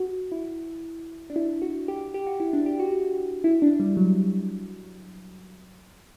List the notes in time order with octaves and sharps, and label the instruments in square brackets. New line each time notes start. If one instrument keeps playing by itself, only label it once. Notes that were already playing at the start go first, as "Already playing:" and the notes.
Already playing: [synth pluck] F#4
E4
D4
E4
F#4
G4
G4
F#4
E4
D4
G4
F#4
F#4
E4
D4
G3
F#3